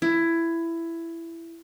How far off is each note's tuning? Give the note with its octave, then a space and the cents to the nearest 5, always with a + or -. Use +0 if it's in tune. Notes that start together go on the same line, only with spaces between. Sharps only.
E4 +15